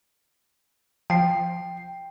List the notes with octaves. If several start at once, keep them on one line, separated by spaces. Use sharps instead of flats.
F3 G5 C7